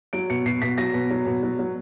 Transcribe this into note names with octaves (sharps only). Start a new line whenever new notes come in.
F#3 D7
B2 C#7
B2 C7
B2 B6
F#3 A#6
B2
F#3
B2
F#3
F#3